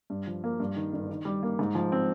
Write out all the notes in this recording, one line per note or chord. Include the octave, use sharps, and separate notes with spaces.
G2
F3
A#3
G2
D#3
G1
D#3
G3
A#3
G#2
F3
C4